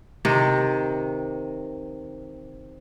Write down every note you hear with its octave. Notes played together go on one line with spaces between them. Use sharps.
C3 D#3